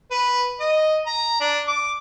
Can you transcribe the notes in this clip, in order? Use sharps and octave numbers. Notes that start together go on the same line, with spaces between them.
B4
D#5
A#5
D4
D6